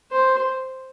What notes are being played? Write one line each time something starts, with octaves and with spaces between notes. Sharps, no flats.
C5